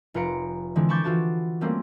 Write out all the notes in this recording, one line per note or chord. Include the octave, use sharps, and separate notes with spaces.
F1 F4 B4 A#5 C#7 D7
D3 E3 G#3 C4
A5 B5 C#6 D6 G6 A6
E3 F4 F#4 A5 A6
G3 A3 A#3 C4 C#4